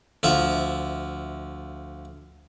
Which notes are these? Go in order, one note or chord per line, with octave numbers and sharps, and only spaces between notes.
D2 F3 E5